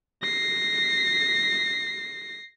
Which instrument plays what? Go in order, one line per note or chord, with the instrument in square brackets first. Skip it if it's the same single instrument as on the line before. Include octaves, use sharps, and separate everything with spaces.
[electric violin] A#6 C7